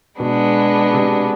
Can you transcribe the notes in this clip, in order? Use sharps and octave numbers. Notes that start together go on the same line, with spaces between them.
B2 G#3 B3 D4
C3